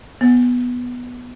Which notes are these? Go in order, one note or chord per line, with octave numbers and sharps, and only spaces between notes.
B3